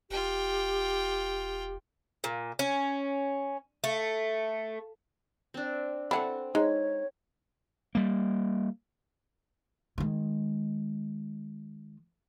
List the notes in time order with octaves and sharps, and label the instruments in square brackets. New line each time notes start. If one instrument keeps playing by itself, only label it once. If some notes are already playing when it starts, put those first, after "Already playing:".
[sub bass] E1 [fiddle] F4 G5 [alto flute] G4
[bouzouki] A#2
C#4
A3
[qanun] C4 D4
[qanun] C4 [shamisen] D4 E4 [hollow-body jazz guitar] A4 F#5 B5
[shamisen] G#3 [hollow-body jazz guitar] D#4 [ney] C#5
[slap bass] G3 A#3
[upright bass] D#3 G#3